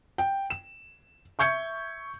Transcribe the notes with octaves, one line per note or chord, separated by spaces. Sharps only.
G5
E7
E5 C#6 G6 G#6 C#7